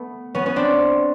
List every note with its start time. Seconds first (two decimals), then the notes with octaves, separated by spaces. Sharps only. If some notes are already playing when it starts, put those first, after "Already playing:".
Already playing: A3 B3
0.35 B3 C#4
0.46 B3 C#4
0.56 C4 D4